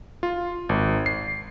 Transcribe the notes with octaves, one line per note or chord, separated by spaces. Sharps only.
F4
G#1
C7